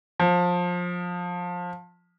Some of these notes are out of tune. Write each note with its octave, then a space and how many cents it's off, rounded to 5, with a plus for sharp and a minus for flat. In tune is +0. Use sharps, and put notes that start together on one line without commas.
F3 +20